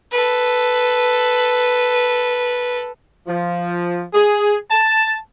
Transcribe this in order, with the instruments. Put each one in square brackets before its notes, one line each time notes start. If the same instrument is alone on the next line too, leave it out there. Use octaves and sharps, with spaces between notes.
[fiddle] A4 B4
[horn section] F3
G#4
A5